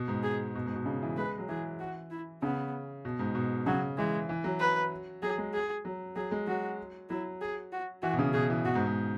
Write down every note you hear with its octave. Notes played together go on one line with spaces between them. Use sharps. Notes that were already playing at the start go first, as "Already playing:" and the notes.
Already playing: B2
G#2
G#4
B2
G#2
B2
C#3
E3
G#3 B4
F#3
E3 G#4
F#4
E4
C#3 B3
B2
G#2
B2
C#3 F#3
E3 G#3
E3
F#3
B4
F#3 G#4
G#3
G#4
F#3
F#3 G#4
G#3
F#3 F#4
F#3 E4
G#4
F#4
E3 F#4
B2
C#3
B2 G#4
E3
B2 F#4
G#2
G#2